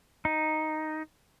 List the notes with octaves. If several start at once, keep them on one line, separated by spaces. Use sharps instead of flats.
D#4